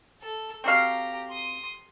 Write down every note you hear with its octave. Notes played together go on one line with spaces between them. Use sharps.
A4
C4 F#4 G4 F5 A#5
C6 D#6